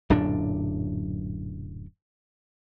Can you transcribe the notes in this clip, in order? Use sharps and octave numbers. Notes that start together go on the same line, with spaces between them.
D1 F#2 A#2 D4